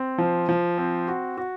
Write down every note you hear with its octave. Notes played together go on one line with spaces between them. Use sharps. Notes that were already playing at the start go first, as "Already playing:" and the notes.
Already playing: C4
F3
F3
C4
F#4
F#4